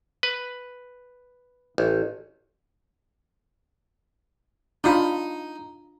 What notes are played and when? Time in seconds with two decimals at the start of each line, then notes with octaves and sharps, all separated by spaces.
0.23 B4
1.78 A1
4.84 D4 D#4 F4 B5